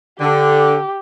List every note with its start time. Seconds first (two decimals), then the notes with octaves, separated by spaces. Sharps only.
0.20 D3 G4